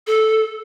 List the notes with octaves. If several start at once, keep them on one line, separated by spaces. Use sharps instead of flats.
A4